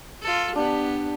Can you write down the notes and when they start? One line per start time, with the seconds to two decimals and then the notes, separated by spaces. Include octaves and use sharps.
0.22 F4 A4
0.56 B3 D4 G4